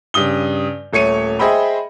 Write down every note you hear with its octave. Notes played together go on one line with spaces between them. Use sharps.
G2 C#3 D#6 G7
D#1 A3 C#5 C#7 D#7
G#4 C5 D#5 E5 G5 B5